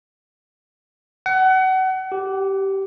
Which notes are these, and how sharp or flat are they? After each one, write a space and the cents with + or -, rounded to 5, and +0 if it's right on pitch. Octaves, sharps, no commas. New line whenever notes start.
F#5 +30
G4 -15